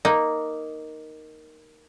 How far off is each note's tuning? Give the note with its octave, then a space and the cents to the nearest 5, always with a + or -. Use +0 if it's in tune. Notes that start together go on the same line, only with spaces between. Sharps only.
A#3 +0 D#4 +0